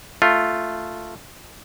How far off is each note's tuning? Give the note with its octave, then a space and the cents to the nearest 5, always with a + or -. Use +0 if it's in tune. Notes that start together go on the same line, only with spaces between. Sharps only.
A3 +0 F4 +0